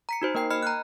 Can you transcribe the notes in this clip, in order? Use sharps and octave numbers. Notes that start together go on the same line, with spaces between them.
A#5 B6 C#7
D#4 F#4 C5
A#3 A#4 G5 C7
D#5 B5 F6 C#7
A#5 F6 F#6